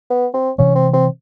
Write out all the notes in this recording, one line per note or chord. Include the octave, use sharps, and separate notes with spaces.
B3
C4
C3 E3 G#3 C#4
C4
C4